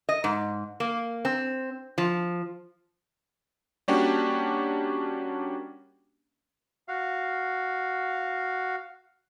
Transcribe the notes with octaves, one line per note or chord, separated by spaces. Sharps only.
D#5
G#2
A#3
C4
F3
G3 A#3 C#4 D4 F#4 G4
F#4 F5